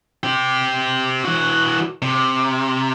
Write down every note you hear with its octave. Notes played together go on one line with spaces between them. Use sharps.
C4 G4
E3 F#4
C3